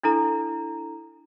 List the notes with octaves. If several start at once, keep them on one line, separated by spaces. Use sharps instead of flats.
D4 E4 A4 A#5